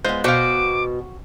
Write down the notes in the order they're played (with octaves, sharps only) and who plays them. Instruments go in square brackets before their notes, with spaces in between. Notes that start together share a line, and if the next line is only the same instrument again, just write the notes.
[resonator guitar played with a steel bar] G#3 B3 [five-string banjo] F4 G#4 C5
[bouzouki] B2 [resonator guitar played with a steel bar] F#4 C5 [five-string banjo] G4 F5 [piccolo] D6